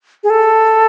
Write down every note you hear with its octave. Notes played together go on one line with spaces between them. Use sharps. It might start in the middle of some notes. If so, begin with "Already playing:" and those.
G#4
A4